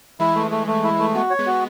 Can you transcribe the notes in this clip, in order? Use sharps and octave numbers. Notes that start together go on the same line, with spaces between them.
E3 G#3 E4
A3
A3
A3
E4
A3
G#3 B3 F#4
C#5
G#3 B3
F#4